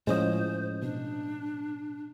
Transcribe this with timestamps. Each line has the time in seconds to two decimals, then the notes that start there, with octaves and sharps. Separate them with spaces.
0.07 A2 F3 G#3 C#4 C5 D#5
0.83 B2 D4